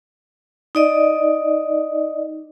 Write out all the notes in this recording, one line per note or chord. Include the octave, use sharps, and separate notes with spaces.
D#4 D5 D#5